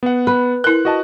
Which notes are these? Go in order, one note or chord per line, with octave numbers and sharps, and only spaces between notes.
B3 F#5
B4
E4 A#4 F#6
F#4 D#5 A5